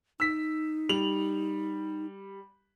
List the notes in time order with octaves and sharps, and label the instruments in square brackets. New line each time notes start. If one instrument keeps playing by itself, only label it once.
[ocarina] D#4 [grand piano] E6 B6
[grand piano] G3 F7 F#7